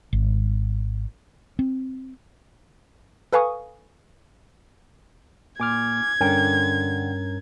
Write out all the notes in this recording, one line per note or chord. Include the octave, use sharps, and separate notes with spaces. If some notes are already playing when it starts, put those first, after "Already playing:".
G#1
C4
A4 B4 F5 G#5 C#6 D#6
A#2 G#5 D6 F6 G#6
G2 D3 C#4 A#4 G5